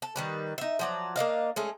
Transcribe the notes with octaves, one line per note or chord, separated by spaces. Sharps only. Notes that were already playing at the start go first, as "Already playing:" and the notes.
A4
D#3 G3 B4
D#4 E5
F3 F#3 D5
A#3 D4 D#5 F5
G#3 A3 C#4